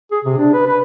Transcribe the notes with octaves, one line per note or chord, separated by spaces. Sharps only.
G#4
C3
D4
B4
B4